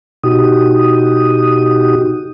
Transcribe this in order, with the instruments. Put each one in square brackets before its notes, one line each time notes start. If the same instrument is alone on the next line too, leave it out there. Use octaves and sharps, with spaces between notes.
[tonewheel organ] B2 D#4 F#4 G4 D#6